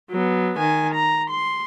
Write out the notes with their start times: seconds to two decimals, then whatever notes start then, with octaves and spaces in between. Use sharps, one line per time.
0.10 F#3 B3
0.58 D#3 G#5
0.94 A#5
1.30 C6